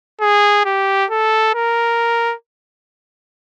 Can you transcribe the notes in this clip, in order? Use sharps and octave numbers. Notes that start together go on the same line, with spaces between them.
G#4
G4
A4
A#4